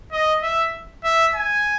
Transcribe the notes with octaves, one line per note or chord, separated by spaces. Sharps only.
D#5
E5
E5
G#5